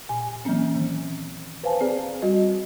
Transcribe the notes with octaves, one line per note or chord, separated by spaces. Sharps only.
A#2 G#5
E3 F#3 A#3 C4 C#4
D#3
B4 C5 F5 G#5 A5
C4 G#4 D5
G3 F#4 D#5